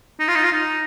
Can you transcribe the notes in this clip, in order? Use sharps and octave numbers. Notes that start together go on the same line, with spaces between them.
D#4
F4
D#4
F4
D#4